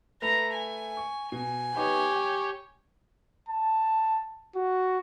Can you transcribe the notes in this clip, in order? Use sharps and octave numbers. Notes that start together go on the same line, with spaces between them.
A3 B4 A#5
G#5
C#6
B2 G#5
B3 D#4 G4 B4 C#5
G5
A5
F#4